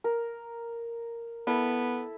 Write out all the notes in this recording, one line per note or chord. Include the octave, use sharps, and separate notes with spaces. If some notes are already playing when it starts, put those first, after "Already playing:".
A#4
B3 E4 A4 B5